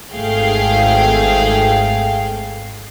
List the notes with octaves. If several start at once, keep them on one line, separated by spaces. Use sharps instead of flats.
G#1 A3 G#4 F5 G5